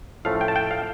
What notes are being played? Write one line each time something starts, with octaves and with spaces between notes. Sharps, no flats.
A2 F3 A3 C#4 F5
G5
A5
G5
F5